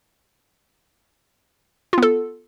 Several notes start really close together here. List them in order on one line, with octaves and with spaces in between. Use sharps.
F4 B3 A4